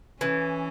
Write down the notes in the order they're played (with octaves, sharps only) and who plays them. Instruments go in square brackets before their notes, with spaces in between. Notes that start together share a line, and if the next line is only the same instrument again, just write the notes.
[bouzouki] E3 [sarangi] C#4